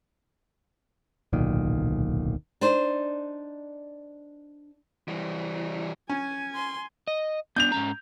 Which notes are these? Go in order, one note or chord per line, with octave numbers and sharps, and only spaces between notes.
D1 B1 A#2 D#3
D4 D#4 C5
E3 G3
C#4 G#5
C6
D#5
B3 D4 G6 F7
G#2 C#4 A#5